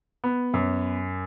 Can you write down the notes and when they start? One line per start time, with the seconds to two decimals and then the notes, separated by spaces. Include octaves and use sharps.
0.24 B3
0.54 F#2